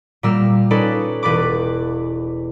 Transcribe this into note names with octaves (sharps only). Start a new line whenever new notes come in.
A#2 G3 A#3 E6 F6
C#4 D#4 A4 B4 D5 B5
E1 B4 D5 B5 D6